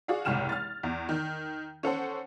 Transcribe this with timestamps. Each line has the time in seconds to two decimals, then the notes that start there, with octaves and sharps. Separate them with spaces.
0.08 F#4 G#4 D5 F5
0.25 F#1 C2 G#2 G5 F6 E7
0.49 F6 A6
0.83 E2
1.09 D#3
1.83 C#4 A4 C5 F#5